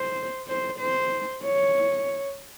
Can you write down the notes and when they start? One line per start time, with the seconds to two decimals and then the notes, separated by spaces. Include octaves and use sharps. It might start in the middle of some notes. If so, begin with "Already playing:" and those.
Already playing: C5
0.48 C5
0.79 C5
1.45 C#5